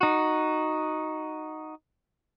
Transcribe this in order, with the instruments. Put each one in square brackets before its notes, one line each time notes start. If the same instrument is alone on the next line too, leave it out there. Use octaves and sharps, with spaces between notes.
[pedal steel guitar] D#4 F#4